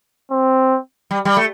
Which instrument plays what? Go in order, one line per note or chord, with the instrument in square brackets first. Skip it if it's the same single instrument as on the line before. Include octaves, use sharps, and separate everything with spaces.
[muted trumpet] C4
[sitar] G3
G3
A3